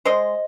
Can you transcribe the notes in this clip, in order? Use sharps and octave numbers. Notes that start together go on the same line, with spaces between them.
G#3 C5 D#5